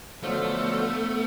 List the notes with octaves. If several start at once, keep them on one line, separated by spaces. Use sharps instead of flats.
D3 F3 F#3 A3 B3